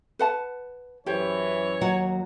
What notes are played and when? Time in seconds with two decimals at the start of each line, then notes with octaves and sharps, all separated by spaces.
0.19 B4 F#5 A5
1.06 F#2 E3 G4 C5 C#5
1.81 D#2 F#3 F#5